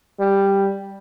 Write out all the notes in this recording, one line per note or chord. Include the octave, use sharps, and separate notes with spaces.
G3